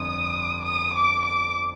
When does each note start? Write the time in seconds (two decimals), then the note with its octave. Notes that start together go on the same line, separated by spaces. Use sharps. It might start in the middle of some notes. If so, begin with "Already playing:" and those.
Already playing: G1 F2 D#6
0.63 D#6
0.94 D6
1.24 D6